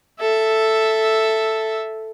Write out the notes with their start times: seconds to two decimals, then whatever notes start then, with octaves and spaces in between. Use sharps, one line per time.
0.20 A4 E5